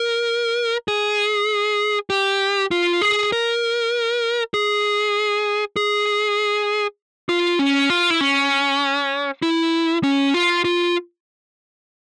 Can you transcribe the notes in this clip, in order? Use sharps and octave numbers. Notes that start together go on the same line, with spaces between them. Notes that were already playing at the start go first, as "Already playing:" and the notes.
Already playing: A#4
G#4
G4
F4
G#4
A#4
G#4
G#4
F4
C#4
F4
E4
C#4
E4
C#4
F4
F4